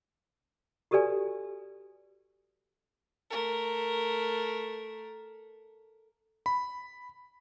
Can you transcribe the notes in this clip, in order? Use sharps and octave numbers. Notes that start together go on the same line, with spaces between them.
F#4 G4 A4 B4 D5 G#5
A3 A#4
B5